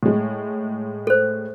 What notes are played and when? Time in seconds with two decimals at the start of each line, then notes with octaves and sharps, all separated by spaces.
0.03 A2 G#3
1.07 A4 C5